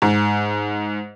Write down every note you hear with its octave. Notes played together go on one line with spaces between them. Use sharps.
G#2